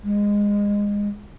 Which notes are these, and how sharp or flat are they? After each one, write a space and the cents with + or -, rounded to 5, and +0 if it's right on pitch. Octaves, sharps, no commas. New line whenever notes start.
G#3 -20